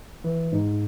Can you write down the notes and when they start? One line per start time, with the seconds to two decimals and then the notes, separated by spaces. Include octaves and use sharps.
0.24 E3
0.52 G#2